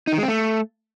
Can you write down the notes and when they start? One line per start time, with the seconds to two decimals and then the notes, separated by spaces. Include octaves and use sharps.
0.07 D#4
0.13 D#3
0.18 G#3
0.23 C4
0.28 A3